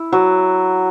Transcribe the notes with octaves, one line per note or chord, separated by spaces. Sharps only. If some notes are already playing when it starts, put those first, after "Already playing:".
Already playing: E4
F#3